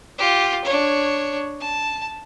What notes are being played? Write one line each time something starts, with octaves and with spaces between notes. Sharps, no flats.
F4 G4
D4 C#5
A5